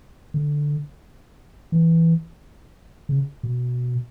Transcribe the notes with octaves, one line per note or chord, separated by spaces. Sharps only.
D3
E3
C#3
B2